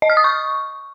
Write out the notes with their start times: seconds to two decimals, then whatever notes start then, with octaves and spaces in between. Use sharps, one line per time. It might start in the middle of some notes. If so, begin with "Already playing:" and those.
0.02 D#5
0.10 F6
0.17 D#6
0.24 C#6